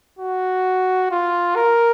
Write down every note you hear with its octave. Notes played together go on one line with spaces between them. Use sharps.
F#4
F4
A#4